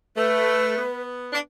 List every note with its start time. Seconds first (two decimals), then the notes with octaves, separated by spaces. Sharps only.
0.17 A3 B4
0.77 B3
1.33 D4